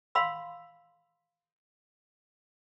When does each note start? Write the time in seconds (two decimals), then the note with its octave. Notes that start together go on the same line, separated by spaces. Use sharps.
0.15 F5 B5 C6 E6